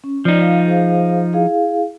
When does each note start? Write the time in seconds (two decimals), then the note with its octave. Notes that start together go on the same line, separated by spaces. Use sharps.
0.04 C#4
0.25 F3 D#4 F4 D5
0.41 F5
0.66 G#4 C5 F5
1.33 E4 G#4 F5